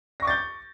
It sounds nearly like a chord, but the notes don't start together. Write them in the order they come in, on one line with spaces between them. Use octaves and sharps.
A#6 C#6 D6 A6 G6